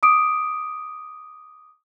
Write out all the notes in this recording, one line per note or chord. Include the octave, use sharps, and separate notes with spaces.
D6 D#6 D7